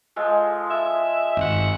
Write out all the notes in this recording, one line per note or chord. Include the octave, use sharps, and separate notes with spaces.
F3 G#3 A4
G#4 E5
G#1 G2 F#5